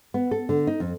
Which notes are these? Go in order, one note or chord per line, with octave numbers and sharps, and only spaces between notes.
B3
A4
D3
D#4
F2